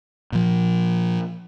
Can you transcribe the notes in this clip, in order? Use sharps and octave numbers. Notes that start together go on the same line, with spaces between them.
A#2 F3